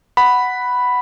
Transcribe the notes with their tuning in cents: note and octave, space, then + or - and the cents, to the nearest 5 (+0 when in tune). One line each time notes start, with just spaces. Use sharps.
F#5 +0 B5 +0